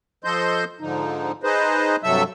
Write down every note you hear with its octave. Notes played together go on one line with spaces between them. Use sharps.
F3 A4 C5 D#5 C6 G6
G#2 D3 F3 D#4
D#4 G#4 B4 C5 D#5
G2 C3 F#3 A4 E5 E6